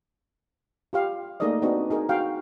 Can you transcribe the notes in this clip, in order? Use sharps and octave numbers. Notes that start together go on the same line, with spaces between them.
F4 G4 F5
A3 A#3 D#4 G#4 D5 D#5
B3 C4 D4 D#4 F#4
D#4 G#4 A#4
F#4 F5 G5